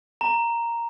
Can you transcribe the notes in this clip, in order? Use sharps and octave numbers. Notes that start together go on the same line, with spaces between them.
A#5